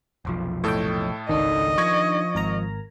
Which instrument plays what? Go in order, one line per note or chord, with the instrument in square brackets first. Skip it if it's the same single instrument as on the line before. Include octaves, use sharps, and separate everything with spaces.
[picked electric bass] F1 B1 F3
[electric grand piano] A2 A4 [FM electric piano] C#5 D#5 G5
[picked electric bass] G#1 C#2 [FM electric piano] D#3 D4 [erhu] D#5
[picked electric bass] F3 [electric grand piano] C#6 G#6 A#6
[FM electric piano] G#1 A#4 A#5